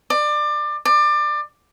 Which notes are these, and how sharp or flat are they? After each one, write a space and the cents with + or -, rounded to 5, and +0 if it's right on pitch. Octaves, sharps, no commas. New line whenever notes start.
D5 +25
D5 +25